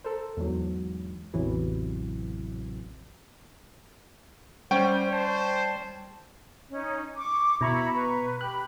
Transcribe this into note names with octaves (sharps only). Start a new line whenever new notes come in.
A4 A#4 C5
E2 G#2 F#3
A1 E2 C3 E3 F#3
G3 C#4 C5 G5
C5 A5
C#4 D#4
C#6 D6
B2 E4 A#5 B5 C#6
B4
G4 B5 F#6